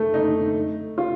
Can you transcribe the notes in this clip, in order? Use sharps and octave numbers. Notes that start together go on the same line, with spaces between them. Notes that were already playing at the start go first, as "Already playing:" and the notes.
Already playing: A3
D#4
F4